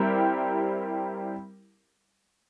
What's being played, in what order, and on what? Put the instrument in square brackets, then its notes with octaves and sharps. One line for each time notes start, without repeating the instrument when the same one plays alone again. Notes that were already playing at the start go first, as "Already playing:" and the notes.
Already playing: [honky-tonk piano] G3 C4 E4 G4 A#4